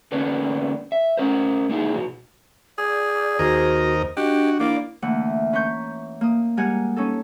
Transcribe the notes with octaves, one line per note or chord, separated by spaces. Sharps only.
D3 A#3 B3 C#4 D4
E5
C#4 A#4 C5
A#3 D#4 E4 G#4
B2 F#3
G#4 D5
D#2 F#4 A#4 C5 D#5
D4 F#4 G4 D#5
A#3 E4 D5
D2 E3 A#3 F#5
C#4 B4 A#5 C#6 G6
A#3 D#6
G3 G#3 G4 A#4 F#5 G#5
C#4 D#4 A4